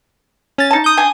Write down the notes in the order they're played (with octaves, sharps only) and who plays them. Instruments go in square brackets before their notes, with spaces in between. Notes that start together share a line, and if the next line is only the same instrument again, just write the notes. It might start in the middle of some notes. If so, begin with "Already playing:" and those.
[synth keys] C#4 A6
[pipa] D#4 A5
[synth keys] D#6 G6
[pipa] D4 G#5